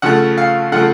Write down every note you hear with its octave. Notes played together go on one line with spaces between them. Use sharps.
C#3 F3 A3 F#5
F5
C#3 F3 A3 F#5